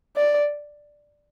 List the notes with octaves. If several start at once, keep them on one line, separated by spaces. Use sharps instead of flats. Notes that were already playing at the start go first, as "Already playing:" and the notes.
D5